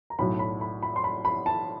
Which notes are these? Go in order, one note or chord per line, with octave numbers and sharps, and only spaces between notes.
A#5
B1 A2 F#3 B5
B5
B5
B5
C6
B5
B5
A5